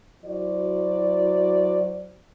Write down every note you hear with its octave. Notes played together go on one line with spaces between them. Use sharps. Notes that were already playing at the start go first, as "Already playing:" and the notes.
F#3 E4 F#4 C5 D5